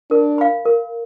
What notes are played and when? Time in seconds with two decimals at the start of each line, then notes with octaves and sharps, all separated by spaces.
0.11 D4 A#4
0.38 F5 B5
0.65 A#4